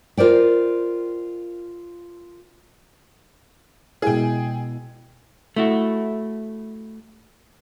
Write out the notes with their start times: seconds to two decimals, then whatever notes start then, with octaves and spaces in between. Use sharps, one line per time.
0.17 F4 A#4 C5 D5 G5
4.02 B2 G#3 E4 G#4 G5
5.56 A3 E4 F#4